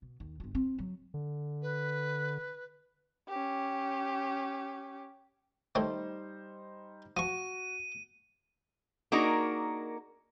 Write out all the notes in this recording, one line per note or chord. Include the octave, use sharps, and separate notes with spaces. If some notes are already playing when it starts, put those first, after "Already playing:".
B2
D#2
G1 F4
C4
F#3
D3
B4
C#4 G4
D#3 G3 A3 D#4 C5 C#5
F3 F#4 C#6 D#7
A#3 D4 D#4 F#4 G#4 A#4